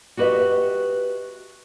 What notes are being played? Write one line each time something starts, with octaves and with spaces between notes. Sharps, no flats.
F#4 G4 B4 C5 D#5 E5